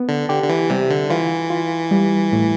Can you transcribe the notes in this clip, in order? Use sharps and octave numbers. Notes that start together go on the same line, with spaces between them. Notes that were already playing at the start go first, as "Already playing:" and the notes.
Already playing: B3
D3
D3 G4
D3
E3
C3 G3
D3
E3 F4
F4
G3
A2